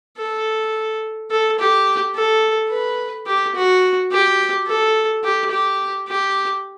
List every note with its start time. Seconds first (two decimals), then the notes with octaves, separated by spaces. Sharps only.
0.17 A4
1.31 A4
1.59 G4
2.15 A4
2.70 B4
3.27 G4
3.55 F#4
4.12 G4
4.67 A4
5.24 G4
5.51 G4
6.08 G4